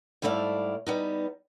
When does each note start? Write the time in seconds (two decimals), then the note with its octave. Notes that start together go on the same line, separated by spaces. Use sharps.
0.22 G#2 G3 A3 E4 D5 F5
0.87 G3 B3 D#4